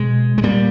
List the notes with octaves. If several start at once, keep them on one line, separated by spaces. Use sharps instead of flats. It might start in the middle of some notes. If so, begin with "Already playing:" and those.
Already playing: B2 G#3
G#3
A#2 G3